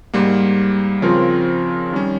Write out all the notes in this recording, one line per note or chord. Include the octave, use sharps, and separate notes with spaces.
G#2 G3 A#3
C#3 F3 C4 F4 A#4
D#3 G3 C#4